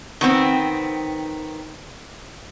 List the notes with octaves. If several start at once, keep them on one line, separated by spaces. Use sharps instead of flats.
D#3 B3 C4